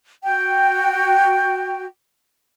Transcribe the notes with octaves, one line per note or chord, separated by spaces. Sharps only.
F#4 G5